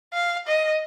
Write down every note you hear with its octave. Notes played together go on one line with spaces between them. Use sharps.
F5
D#5